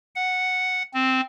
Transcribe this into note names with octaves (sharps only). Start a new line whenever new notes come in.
F#5
C4